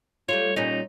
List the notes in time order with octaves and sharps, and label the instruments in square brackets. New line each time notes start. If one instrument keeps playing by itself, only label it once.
[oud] G3 A3 F4 [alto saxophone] C#5
[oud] A#2 G3 C#4 [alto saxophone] D#4